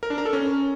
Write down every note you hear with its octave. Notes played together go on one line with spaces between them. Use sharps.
A#4
D4
A#4
A4
C#4